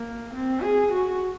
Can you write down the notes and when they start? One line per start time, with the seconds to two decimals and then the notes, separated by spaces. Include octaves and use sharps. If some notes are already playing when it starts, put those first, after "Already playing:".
Already playing: A#3
0.33 C4
0.63 G#4
0.92 F#4